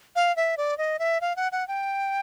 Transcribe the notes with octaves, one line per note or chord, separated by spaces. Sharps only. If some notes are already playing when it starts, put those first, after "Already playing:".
F5
E5
D5
D#5
E5
F5
F#5
F#5
G5